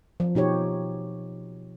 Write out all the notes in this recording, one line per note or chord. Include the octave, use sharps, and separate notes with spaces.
F3
B2 D#4 G4 C#5